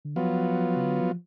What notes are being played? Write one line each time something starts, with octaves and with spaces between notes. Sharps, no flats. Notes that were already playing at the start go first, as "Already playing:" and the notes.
D3
F3 F#3 B3 F4
C#3
D3
F3